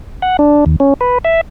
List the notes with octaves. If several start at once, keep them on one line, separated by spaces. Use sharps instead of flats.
F#5
D4
D#2
C#4
B4
E5